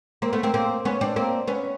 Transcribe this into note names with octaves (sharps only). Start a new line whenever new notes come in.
A#3 C4
A3 B3
A#3 C4
A#3 C4
B3 C#4
C4 D4
A#3 C4
B3 C#4